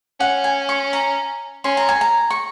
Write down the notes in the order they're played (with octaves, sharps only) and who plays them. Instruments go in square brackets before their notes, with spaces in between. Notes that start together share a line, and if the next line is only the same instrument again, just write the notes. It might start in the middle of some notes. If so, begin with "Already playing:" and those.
[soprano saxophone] C#4 [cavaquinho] F#5
[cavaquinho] G#5
C#6
A#5
[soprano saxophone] C#4 [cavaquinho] C6
[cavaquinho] A#5
G#5
A#5
C#6